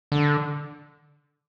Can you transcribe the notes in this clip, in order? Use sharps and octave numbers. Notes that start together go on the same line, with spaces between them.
D3